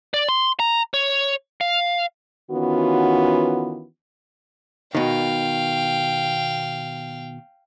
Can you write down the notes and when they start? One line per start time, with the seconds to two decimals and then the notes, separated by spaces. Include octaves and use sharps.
0.14 D5
0.29 C6
0.60 A#5
0.94 C#5
1.61 F5
2.51 D#3 E3 B3 C#4 F4 F#4
4.95 B2 D#3 F5 G5